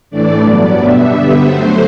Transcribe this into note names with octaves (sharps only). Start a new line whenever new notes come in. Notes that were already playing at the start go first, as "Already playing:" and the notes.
A2 E3 A3 D4 D5
G2 F#3 B3
B2 G3 B3 D4 E5
G2 D3 G3 B3
D3 F#3 A3 C5